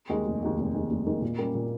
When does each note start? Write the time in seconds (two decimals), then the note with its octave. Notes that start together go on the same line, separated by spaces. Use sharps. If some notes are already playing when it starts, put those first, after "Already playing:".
0.09 D#2 D#3 G#3
0.26 F1
0.43 D#2 D#3 G#3
0.58 F1
0.74 D#2 D#3 G#3
0.90 F1
1.06 D#2 D#3 G#3
1.22 A#2
1.38 G3 A#3 C#4
1.55 A#2